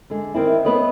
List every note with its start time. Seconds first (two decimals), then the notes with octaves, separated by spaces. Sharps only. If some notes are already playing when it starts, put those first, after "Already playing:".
0.10 D3 G#3
0.34 D#3 C4 E4
0.65 G3 B3 C4 B4 C#5 D#5